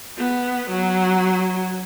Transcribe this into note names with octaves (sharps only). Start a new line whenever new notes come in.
B3
F#3